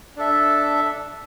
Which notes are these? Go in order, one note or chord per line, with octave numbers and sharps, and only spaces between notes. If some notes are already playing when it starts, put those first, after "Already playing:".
D4 A4 E5